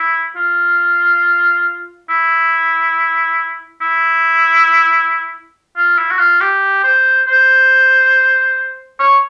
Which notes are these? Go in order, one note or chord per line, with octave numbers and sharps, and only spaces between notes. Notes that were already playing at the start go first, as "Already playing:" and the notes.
Already playing: E4
F4
E4
E4
F4
E4
F#4
F4
G4
C5
C5
C#5